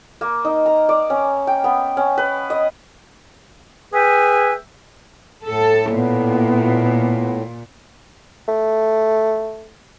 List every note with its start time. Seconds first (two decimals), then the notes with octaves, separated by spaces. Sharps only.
0.21 A#3
0.45 D#4
0.66 A#5
0.89 D5
1.10 C#4
1.47 G5
1.64 B3
1.97 C#4
2.18 B4
2.50 D#5
3.93 G#4 B4 E5 G5 G#5
5.47 A2 A4
5.94 A#2 B3
8.48 A3